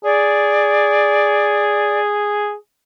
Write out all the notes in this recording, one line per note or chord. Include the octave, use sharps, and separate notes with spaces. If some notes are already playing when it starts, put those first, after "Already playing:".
G#4 D5